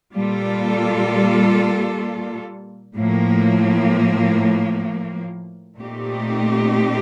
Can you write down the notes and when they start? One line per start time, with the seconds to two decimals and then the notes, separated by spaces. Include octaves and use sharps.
0.14 A#2 G3 A#3 F4 A4
2.96 A2 F3 A#3
5.78 A#2 A3 C4 D#4 G4